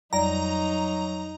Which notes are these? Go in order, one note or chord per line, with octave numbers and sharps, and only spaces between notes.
F2 F#3 G3 D#4 D5 A#5